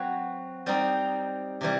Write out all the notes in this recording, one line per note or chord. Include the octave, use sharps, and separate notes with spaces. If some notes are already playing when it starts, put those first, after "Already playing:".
Already playing: F#3 C4 F#4 B4
G3 C4 D#4
C3 E3 G3